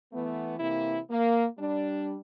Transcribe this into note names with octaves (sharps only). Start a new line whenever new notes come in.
E3 A3 B3
C3 E3 A#3 E4
A#3
G3 D4